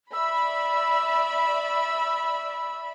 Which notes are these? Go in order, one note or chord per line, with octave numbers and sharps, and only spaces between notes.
D5 E5 B5 E6